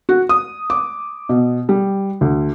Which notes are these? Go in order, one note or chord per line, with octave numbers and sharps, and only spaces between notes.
F#4
D#6
D6
B2
G3
D2